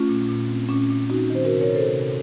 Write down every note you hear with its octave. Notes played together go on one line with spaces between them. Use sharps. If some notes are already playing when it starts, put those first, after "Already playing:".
Already playing: A3 C#4 F4
A#2
A#2
C4
A#2 C#4
A#2
C4 D#4 F#4
D#3 C5
C3 F#4 A#4
A#4 C#5
C3
A4 C5
C3